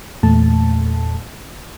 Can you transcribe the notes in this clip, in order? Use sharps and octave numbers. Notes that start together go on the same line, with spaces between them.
E2 A#2 A3 A5